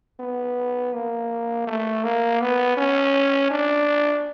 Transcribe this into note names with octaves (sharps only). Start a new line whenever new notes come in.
B3
A#3
A3
A#3
B3
C#4
D4